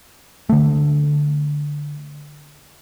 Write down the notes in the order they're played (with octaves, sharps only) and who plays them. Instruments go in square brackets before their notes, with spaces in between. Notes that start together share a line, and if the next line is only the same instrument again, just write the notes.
[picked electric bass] D3 A3